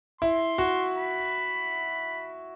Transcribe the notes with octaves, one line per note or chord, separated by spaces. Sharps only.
E4 C6
F#4
B5